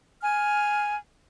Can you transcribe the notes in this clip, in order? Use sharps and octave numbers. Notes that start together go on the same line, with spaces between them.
G#5 F6